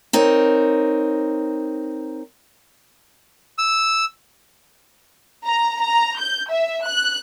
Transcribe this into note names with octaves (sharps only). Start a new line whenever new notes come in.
C4 D#4 A#4 C#5
E6
A#5
A#5
G6
E5
F#6